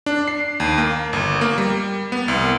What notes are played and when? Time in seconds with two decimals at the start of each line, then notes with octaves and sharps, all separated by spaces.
0.06 D4
0.28 C7
0.60 D#2
0.78 A#3
1.13 G1
1.41 A#3
1.58 G3
2.12 B3
2.28 C2